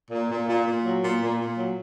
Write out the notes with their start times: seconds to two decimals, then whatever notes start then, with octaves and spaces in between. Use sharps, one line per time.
0.11 A#2
0.30 A#2
0.48 A#2
0.66 A#2
0.84 F#3
1.03 A#2
1.21 A#2
1.39 A#2
1.58 F#3